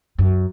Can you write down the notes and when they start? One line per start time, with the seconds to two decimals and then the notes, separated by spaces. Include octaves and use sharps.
0.18 F#2